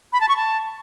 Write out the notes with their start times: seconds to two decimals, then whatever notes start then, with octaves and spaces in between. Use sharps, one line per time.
0.13 B5
0.21 A5
0.29 C#6
0.37 A5